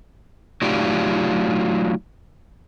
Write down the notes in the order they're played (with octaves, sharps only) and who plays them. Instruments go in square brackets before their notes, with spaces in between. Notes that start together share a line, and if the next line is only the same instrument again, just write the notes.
[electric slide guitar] F#3 A3 D#4 F4 G4 D5